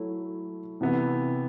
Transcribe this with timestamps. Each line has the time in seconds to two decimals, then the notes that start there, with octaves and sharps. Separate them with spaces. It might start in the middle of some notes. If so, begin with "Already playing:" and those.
Already playing: F#3 A3 E4
0.81 C3 E3 B3 E4